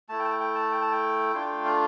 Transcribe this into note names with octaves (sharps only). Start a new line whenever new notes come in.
A3 E4 A5
G5
A5
G5
G5
A5
G5
A5
G5
A3 D4 F4
F5